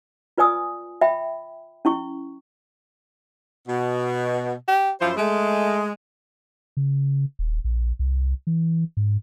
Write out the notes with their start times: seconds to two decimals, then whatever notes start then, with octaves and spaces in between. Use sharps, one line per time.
0.38 F4 B4 D5 G#5 D#6 E6
1.01 E5 G5 B5
1.85 C#4 E4 C#6
3.68 B2
4.68 G4
5.01 F#2 F3 E4 C5
5.17 G#3 A3
6.77 C#3
7.39 D#1
7.64 A#1
7.99 C2
8.47 E3
8.97 G#2